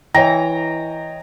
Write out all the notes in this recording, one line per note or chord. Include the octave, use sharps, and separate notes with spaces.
E3 C#5 D#5 G5 A#5